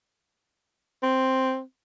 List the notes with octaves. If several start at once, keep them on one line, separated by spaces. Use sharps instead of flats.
C4